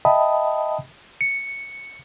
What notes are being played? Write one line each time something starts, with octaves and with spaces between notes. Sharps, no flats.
D#5 E5 G5 A5 B5 D#6
C#7